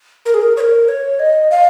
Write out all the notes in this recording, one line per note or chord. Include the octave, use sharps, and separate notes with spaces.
A#4
G#4
A#4
C#5
A#4
C#5
D#5
F5